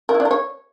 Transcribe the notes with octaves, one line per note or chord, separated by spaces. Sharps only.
A#4
E4
D4
A#4
C#5